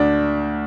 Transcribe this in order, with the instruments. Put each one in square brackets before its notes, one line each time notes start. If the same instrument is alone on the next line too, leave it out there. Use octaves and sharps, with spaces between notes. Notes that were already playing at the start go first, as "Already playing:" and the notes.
Already playing: [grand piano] D2 D4